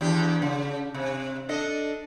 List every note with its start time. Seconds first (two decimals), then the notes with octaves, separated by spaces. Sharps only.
0.01 E2 D4 G4
0.42 C#3
0.94 C3
1.49 D4 A4 D#5